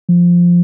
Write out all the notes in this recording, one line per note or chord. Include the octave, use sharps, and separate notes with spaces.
F3